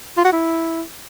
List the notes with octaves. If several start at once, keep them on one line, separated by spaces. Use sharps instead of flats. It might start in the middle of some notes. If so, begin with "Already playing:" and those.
F4
F#4
E4